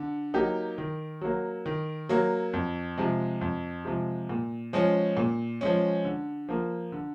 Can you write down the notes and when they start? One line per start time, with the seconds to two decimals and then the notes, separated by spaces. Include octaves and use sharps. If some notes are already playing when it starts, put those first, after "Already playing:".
Already playing: D3
0.34 F#3 A#3 D#4 G4
0.78 D#3
1.21 F#3 A#3
1.66 D#3
2.09 F#3 A#3
2.53 F2
2.98 C3 F3 G#3
3.41 F2
3.85 C3 F3 G#3
4.29 A#2
4.73 F3 G#3 C#4
5.17 A#2
5.61 F3 G#3 C#4
6.05 D3
6.49 F3 A#3
6.92 D3